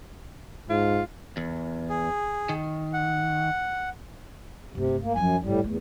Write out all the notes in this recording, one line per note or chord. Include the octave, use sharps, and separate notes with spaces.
G#2 F4
E2
G#4
D#3
F#5
G1 C3 A3
A#3
F#2 F3 F#3 G#5
G1 C2 A2 G3
E2 A3